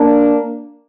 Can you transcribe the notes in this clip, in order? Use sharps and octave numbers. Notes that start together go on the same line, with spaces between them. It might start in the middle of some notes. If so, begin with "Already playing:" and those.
Already playing: A#3 D4